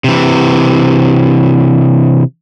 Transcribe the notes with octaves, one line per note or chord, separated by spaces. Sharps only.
C3 E3